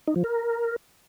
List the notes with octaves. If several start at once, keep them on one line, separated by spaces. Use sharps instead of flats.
D#4
F3
A#4